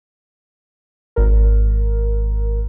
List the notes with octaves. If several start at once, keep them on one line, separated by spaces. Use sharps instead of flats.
G#1 A#4